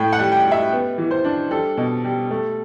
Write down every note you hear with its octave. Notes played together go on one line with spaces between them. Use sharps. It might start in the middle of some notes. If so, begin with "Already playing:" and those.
Already playing: A2 G5
F#5
G3
G5
G3
E5
B3
E3
C5
D4
G3 A4
B2
G3
A3